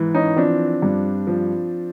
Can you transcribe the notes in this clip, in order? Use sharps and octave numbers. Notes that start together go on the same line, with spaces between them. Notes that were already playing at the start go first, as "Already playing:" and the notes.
Already playing: G#2 E3
C#4 D#4
F3 C4 D4
G2
F3